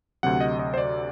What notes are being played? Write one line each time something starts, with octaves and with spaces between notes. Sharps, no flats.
D2 C3 F#3 F#5
D#5
D#5
C5
D5